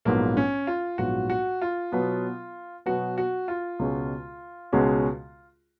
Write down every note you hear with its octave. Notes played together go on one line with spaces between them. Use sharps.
A#1 G#2 F#3 A#3 B3 F4
C#4
F4
A#1 G#2 F#3 B3 F4 F#4
F#4
F4
B2 F#3 B3
B2 F#3 B3 F#4
F#4
F4
C#2 B2 G#3 C#4 F#4
C#2 B2 G#3 C#4 F#4